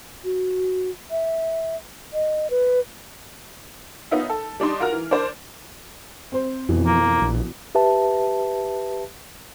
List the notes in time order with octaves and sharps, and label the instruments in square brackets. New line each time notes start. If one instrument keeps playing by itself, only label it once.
[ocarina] F#4
E5
D#5
B4
[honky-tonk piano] B3 C#4 D#4 F4 E5
A4
G3 D4 D#4 C6
F4 F#4 A#4 A#5 F6
E3
D4 A#4 C5 D5
[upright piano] C4 C5
[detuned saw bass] F2 [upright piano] B2 E3
[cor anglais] A#3
[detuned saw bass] A#1
[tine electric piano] G4 B4 E5 A5